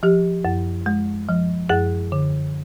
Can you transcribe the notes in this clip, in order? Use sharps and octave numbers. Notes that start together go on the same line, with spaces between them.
F3 G4
F#2
G#3
F3
F#2 G#4
D3